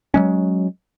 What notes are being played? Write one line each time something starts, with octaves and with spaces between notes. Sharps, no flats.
F#3 G#3 C#4